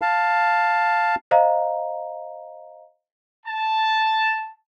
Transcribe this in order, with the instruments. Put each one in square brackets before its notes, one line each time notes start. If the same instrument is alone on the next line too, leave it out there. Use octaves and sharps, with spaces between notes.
[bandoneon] F5 A5
[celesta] C5 D#5 F5 A#5
[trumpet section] A5